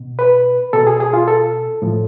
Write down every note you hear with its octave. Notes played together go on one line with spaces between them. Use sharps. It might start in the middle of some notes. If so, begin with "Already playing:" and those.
Already playing: B2
B4
B2 A4
G#4
G#4
F4
A4
A2 F3